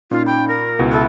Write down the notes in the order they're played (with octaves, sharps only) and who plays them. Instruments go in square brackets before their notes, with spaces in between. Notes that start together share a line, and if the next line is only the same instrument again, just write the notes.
[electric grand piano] A#2 [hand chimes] C#4 D#4 [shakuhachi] F4
[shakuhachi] G5 [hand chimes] B5
[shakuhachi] A#4
[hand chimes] F6
[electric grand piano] C#2 B2 [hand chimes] E4
[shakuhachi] A4 [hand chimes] E5 B5 F#6